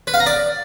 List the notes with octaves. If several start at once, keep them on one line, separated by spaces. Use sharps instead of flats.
B4
F5
A#5
D5